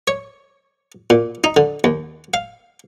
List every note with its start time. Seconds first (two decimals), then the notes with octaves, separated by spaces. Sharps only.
0.08 C#5
1.10 A#2
1.44 D#4
1.57 D3
1.84 D#2
2.34 F5